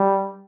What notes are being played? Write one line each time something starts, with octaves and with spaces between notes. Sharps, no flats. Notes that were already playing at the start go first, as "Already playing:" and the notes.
Already playing: G3